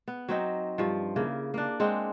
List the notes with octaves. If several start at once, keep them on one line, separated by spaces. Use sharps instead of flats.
B3
F#3 C4 D#4
G2 F3
C#3 A#3 E4
A#3 D4
G#3 C4 F#5